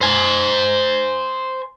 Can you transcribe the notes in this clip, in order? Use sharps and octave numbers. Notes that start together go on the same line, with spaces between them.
C5 G#5